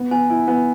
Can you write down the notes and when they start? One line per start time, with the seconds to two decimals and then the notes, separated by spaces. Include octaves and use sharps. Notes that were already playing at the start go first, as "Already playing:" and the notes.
Already playing: B3
0.11 B3 G#5
0.30 E4
0.48 B3